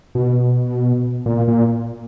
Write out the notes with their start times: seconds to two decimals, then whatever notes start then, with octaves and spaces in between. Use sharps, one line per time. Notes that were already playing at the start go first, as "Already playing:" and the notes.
0.15 B2
1.26 A#2
1.48 A#2